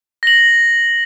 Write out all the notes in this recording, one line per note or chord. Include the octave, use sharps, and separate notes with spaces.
A#6 F#7